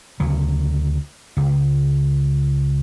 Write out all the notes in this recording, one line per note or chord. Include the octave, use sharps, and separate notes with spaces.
D2 C#3 F#3
C#2